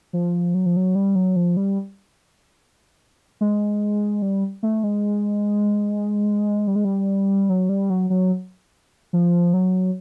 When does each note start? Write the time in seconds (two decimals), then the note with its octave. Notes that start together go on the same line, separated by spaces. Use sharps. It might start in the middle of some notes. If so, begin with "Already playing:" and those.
0.13 F3
0.55 F#3
0.66 F3
0.77 F#3
0.95 G3
1.16 F#3
1.36 F3
1.57 G3
3.41 G#3
4.22 G3
4.63 A3
4.84 G#3
6.67 G3
6.76 G#3
6.85 G3
7.49 F#3
7.69 G3
7.90 F#3
8.10 F#3
9.13 F3
9.54 F#3